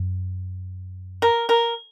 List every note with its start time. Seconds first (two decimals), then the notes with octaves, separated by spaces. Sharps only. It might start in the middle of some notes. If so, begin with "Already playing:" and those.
Already playing: F#2
1.22 A#4
1.49 A#4